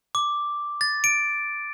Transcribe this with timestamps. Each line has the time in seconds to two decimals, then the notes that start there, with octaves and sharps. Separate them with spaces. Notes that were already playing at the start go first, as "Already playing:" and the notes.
0.15 D6
0.81 A6
1.04 D7